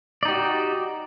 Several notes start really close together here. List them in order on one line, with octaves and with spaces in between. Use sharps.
D5 D#4 G4 F#4